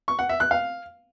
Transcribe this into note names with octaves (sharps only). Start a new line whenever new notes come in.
C#6
F#5
E5
F#6
F5